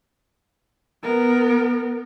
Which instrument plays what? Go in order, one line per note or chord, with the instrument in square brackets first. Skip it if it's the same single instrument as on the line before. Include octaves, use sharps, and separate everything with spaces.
[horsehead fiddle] B3 A#4